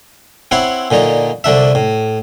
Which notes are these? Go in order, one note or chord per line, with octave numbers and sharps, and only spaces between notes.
C4 E4 C#5 F#5 C6
A#2 D3 D#4 C#5
C2 D3 D4 E5
A2